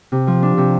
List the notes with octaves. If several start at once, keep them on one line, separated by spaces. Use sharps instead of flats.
C3
F3
D4
C3